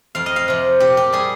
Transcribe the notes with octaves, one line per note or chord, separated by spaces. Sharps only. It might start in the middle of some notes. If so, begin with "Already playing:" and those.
F2 F5
D#5
F5
C3 F3
A#2 G4
G4
G3 G#4